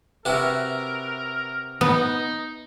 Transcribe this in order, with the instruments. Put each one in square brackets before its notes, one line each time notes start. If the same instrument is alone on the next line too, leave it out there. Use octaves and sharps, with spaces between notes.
[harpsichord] C3 F#4 [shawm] A#4 [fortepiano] B4 E5
[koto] B3 [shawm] D#4